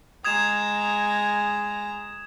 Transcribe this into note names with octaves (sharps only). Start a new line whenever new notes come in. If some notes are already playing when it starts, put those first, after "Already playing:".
G#3 A#5 D#6 G#6 E7